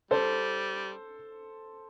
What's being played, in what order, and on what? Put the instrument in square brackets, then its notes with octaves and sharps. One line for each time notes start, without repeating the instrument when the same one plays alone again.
[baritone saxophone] G3 [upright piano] A4 C5